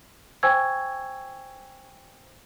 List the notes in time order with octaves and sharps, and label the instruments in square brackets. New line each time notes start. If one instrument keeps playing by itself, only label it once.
[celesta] C5 G5 G#5 C#6 E6 G#6